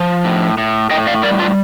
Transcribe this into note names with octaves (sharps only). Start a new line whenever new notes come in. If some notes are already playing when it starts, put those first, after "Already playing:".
Already playing: F3
A2
A2
A2 D#5 G5
D5 F5
G3 A#4 D5
D4 F4